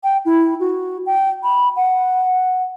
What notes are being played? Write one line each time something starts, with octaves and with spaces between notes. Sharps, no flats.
G5
E4
F#4
G5
B5
F#5